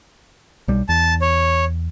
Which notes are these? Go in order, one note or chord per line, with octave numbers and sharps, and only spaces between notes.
B1 G3
E2 A5
C#5